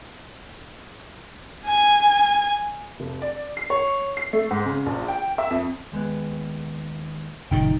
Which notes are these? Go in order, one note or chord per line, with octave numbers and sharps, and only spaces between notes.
G#5
F1
D5
C7
C#5
C7
A3
G#2
C#3
A#1
G5
E5
F2
D#2 G#3 B3
F#1 A#2 D#3 D#4 G5